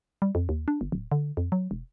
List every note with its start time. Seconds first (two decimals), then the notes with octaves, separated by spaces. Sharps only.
0.22 G3
0.35 F2
0.49 D#2
0.68 D4
0.81 G1
0.92 D1
1.12 D3
1.37 F2
1.52 F#3
1.71 E1